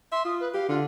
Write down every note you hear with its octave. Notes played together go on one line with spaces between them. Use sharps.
E5 C6
F4 D#6
B4
G4 F5
D3 F4